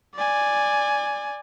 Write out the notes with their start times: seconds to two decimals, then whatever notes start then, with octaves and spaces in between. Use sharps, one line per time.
0.15 D5 G#5